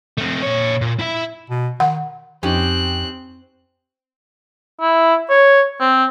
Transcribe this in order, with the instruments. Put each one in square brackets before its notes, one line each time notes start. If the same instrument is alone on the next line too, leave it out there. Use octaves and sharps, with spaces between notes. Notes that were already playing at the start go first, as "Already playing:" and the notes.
[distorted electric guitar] A3 C4
A#2 C#5
A#2
E4 E5
[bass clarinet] B2
[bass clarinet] D#3 [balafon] F#5
[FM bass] F2 [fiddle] C4 F#6 [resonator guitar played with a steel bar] C#4 D#4 G4
[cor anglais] E4
C#5
C4